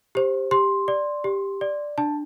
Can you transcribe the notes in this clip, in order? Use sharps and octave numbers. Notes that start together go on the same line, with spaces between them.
G4 C5
G4 C6
D5
G4
D5
D4 A5